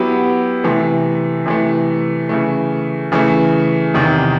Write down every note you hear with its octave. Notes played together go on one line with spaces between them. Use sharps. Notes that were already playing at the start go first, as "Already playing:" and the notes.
Already playing: F#3 B3 E4 G4
C3 E3 A3
C3 E3 A3
C#3 E3 A3
C#3 E3 A3
E2 C3 D#3